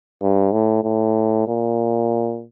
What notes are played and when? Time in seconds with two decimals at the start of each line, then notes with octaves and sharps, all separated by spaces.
0.22 G2
0.53 A2
0.84 A2
1.48 A#2